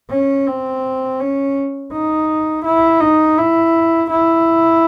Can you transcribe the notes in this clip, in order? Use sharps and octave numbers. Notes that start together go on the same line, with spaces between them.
C#4
C4
C#4
D#4
E4
D#4
E4
E4